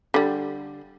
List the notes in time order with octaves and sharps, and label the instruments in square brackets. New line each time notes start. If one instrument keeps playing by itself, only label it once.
[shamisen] D3 G3